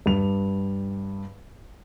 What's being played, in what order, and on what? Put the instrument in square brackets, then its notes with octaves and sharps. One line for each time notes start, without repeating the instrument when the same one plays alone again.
[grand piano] G2 F7